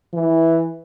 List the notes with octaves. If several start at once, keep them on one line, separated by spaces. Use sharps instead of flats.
E3